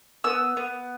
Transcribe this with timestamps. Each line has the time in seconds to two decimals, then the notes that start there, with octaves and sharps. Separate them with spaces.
0.24 B3 E6
0.57 B3